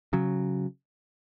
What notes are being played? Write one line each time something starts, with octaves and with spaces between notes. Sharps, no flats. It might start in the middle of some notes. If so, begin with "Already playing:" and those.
C#3 F#3